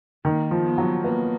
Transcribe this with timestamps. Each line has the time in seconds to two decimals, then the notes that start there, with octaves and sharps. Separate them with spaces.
0.25 D#3 A#3
0.51 F3
0.64 B3
0.78 F#3
1.03 A#3 B3